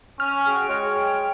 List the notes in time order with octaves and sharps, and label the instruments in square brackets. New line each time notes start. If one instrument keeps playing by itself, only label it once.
[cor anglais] C#4 [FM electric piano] F6
[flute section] F#4 G5 [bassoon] G#4
[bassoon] G#3 [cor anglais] C#5
[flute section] G5